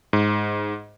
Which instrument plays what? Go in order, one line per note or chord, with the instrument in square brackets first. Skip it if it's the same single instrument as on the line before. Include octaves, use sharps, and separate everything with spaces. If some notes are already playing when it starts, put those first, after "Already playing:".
[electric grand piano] G#2